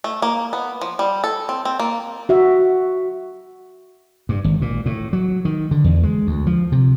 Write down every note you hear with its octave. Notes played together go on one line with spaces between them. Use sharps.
A3
A#3
B3
F3
G3
A4
C4
C4
A#3
F#4 E5
G2
G#1
A#2
A2
F#3
D#3
D3
E2
G#3
D2
F3
C3